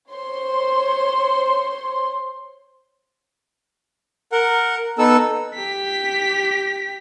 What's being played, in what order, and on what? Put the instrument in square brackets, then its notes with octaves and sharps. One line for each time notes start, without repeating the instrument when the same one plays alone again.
[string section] C5 C#5 C6
[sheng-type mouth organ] A#4 F#5
B3 D#4 A4 E6
[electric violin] G4 B6